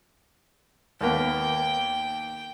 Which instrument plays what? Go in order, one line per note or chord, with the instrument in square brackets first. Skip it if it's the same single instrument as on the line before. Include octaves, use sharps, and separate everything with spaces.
[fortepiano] D#2 A#3 B3 [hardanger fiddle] G5